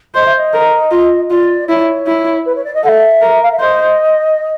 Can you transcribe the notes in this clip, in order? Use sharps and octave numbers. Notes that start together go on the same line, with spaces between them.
C5 D#5
E5
D#5
A#4
F4
F4 D5
E4 C#5
E4
B4
C#5
D5
D#5
A4 E5 F#5
A#4
F5
E5
C5 D#5